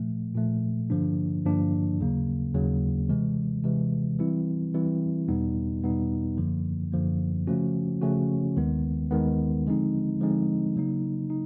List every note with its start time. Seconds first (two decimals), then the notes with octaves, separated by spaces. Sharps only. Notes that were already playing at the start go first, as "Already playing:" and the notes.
Already playing: A#2 F3 A3
0.35 A#2 F3 A3
0.90 G2 D3 F3 A#3 D4
1.45 G2 D3 F3 A#3 D4
2.00 D#2 C#3 F#3 A#3
2.54 D#2 C#3 F#3 A#3
3.09 C3 E3 G#3
3.64 C3 E3 G#3
4.19 E3 G3 C4 E4
4.74 E3 G3 C4 E4
5.28 E2 B2 G3 B3 D#4
5.83 E2 B2 G3 B3 D#4
6.38 F#2 D3 F3 A#3
6.92 F#2 D3 F3 A#3
7.47 C#3 F3 A3 C#4 F#4
8.01 C#3 F3 A3 C#4 F#4
8.57 D#2 D#3 G#3 B3
9.11 D#2 D#3 G#3 B3
9.67 D3 F3 G#3 C4 D#4
10.20 D3 F3 G#3 C4 D#4
10.76 C#3 F#3 A#3 D#4
11.30 D#4